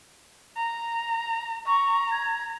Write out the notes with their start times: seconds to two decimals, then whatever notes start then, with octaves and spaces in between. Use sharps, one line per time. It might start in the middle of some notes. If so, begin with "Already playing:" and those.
0.56 A#5
1.66 A#5 C#6
2.11 G#6